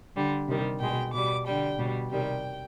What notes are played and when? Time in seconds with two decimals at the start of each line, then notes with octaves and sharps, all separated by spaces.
0.16 D3 G3
0.48 C3 D#3 G3
0.80 B2 G#3 G5
1.13 B2 G3 D6
1.46 D3 G3 G5
1.78 B2 G3
2.11 C3 D#3 G3 G5